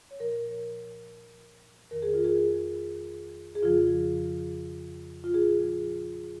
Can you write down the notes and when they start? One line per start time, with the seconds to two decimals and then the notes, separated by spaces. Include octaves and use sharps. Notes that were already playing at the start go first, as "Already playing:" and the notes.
0.11 C#5
0.20 A#2 F3 A#4
1.91 F2 D#3 A#4
2.02 G#4
2.14 F4
2.24 G#4
3.55 G#4
3.62 F2 C#3 F3 F4
5.24 F4
5.34 A#2 F3 G#4